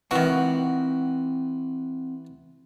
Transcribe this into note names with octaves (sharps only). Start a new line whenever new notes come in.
D#3 E3 C4 F#4 F#5